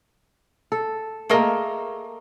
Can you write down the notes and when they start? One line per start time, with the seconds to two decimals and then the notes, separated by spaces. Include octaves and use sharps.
0.72 A4
1.29 A3 A#3 G#4 A#4 D#5